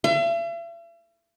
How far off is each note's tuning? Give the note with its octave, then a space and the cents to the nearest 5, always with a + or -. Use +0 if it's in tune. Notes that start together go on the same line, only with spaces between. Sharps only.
E5 +45